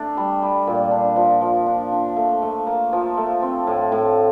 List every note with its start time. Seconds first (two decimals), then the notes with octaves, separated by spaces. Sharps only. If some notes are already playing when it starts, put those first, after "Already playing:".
Already playing: A3 D4
0.17 G3
0.42 G3
0.67 A#2
0.91 D4
1.16 F3
1.41 F3
1.67 D4
1.92 D4
2.17 A3
2.42 A3
2.67 A#3
2.93 F3
3.17 A3
3.42 C4
3.67 A2
3.92 A2